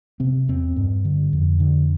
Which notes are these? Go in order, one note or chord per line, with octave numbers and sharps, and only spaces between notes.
C3 C4
E2 C4
G2
D3
F2
D3